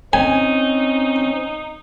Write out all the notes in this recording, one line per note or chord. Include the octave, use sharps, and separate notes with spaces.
C4 C#4 D#4 G#5